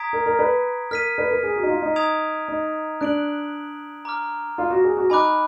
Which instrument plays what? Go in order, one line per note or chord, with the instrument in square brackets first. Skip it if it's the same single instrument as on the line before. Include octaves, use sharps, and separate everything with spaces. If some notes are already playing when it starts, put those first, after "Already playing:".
Already playing: [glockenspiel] A#5 D#6 G#6 B6 D7
[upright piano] A#4
A#4
B4
[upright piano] A#4 [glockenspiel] F6 B6 D#7
[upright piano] B4
A#4
G#4
F#4
D#4
F4
D#4
[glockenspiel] A#5 D#6 G#6 D7 F7
[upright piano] D#4
[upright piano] D4 [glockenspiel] F#6 D7 F#7
[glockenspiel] A#5 D6 F6
[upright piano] F4
F#4
G#4
F#4
[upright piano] D#4 [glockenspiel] G#5 B5 D6 F#6